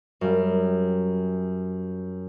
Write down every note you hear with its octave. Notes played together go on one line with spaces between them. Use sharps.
F#2 G3